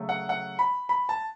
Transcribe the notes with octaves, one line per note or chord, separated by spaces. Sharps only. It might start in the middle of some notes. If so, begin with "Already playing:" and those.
Already playing: C#3 F#3 A3
F#5
F#5
B5
B5
A5